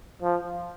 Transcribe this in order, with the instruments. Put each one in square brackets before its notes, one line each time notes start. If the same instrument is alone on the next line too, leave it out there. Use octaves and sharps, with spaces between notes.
[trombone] F3